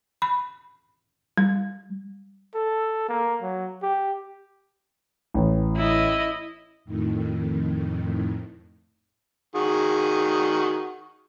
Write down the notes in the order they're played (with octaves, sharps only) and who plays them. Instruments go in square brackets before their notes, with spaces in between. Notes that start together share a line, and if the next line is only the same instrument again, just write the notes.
[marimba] B5
G3
[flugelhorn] A4
A#3
F#3
G4
[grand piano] A1
[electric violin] E4 D#5
[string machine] F2 A2 D#3
[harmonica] D#3 F#4 G#4